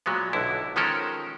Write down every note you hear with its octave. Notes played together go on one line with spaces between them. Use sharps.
A#2 F#3 G#3 B3
B1 D3 E4
D#3 F3 G#3 C#4 A4 A#4